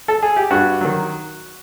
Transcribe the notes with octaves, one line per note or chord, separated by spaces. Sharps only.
A4
G#4
G4
G2 F#4
D#3 F#3